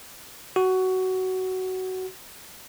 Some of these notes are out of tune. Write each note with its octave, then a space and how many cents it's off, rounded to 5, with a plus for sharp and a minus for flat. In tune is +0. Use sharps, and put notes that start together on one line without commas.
F#4 +15